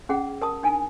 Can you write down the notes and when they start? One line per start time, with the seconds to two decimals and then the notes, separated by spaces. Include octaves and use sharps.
0.09 C#4 G#4 F#5
0.42 A#4 A5 D#6
0.63 D4 D#4 G#5